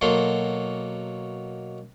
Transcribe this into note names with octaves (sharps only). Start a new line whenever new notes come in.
B2 F#3 A#3 A4 C6